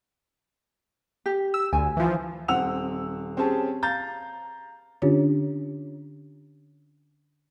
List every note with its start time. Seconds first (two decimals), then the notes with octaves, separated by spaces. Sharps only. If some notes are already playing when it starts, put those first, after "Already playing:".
1.26 G4
1.54 E6
1.73 D2 G#5
1.97 E3 F3
2.48 D#1 C4 F#5 E6 F7
3.37 C4 C#4 G4 G#4 C#5 A5
3.82 F5 A#5 G6 A6
5.02 D3 C#4 D4 F4 G4 C#5